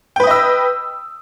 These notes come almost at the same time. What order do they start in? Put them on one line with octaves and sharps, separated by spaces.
G5 B4 D#6 D#5 E6